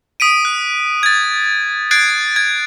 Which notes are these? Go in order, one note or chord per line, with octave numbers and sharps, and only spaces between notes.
D#6 B6 D7 D#7
F#6
G#6 A6
F#6 G#6 A6 C7 D7
G#6